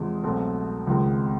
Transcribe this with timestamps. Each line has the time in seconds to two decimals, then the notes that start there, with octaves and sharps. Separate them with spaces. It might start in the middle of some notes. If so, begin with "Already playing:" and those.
Already playing: E2 C3 F3 G#3
0.24 C2 B2 F#3 A3 C4
0.87 C#2 C3 D#3 G#3 C4